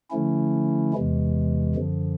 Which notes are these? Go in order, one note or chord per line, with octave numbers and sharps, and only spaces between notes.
D3 F3 A3 C#4 E4
E2 C3 E3 G#3
F#2 D3 F3